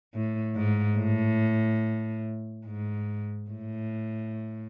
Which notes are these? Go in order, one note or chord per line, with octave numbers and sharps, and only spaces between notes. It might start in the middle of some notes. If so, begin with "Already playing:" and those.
A2
G#2
A2
G#2
A2